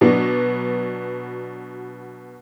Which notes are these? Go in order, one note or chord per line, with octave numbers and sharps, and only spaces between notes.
B2 F#3 B3 D4